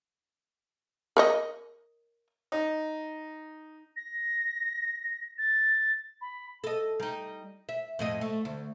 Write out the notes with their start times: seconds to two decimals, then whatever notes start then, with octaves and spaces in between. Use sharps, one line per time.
1.17 A#4 C#5 D#5
2.52 D#4
3.96 A#6
5.38 A6
6.21 B5
6.64 A4 D#5
7.00 G3 D#4
7.69 E5
7.99 F2 A2 D#5
8.21 A3
8.45 D2